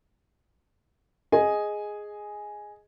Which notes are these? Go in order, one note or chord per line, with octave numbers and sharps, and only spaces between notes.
G#4 D#5 G#5